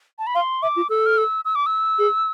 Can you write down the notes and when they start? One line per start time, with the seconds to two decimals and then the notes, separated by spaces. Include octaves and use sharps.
0.19 A5
0.27 B5
0.35 F5 C6
0.62 E5 D6
0.76 F4
0.89 A4 E6
1.06 F6
1.18 E6
1.45 E6
1.55 D6
1.66 E6
1.99 G#4